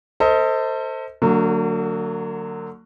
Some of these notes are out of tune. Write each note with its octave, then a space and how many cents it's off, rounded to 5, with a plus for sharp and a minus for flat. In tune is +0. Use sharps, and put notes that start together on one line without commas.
A4 +35 C5 +0 D#5 +30
D3 +0 F#3 +0 A#3 -45